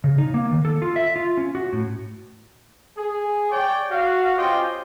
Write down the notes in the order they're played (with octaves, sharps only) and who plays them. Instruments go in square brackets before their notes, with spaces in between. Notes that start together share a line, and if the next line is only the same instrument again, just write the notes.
[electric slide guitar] C#3
D#4
A#3
D#3
A4
F4
E5
F4
C#4
F#4
A2
[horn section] G#4
C#5 D5 G5
F#4 F5
C#4 F4 G4 C5 D#5 G5